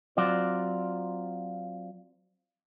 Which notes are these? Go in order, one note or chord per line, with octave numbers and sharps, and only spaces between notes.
F#3 C4 F4 D5